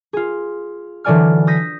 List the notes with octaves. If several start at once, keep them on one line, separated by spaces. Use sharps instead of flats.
F4 G#4
D3 E3 F#3 D5 G#5 F6
D#6 G6 A#6 B6